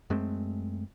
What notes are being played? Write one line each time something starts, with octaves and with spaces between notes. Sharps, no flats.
F#2 G#3 A3 C4